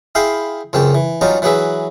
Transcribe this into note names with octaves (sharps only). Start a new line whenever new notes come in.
E4 G#4 F5 G5 B5 C6
C#2 F#2 C4 C#4 G4
E3
F#3 G3 C#4 D#4 F4 A#5
E3 F#3 F#4 G#4 B4 E5